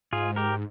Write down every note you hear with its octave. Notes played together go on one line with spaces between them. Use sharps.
G#2 F4 G#4
G4 A#4